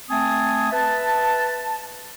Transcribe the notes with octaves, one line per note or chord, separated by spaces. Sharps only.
A3 C4 G#5 A5 D#6
B4 E5 A5